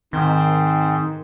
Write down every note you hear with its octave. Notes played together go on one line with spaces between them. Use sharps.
G#2 D#3 C4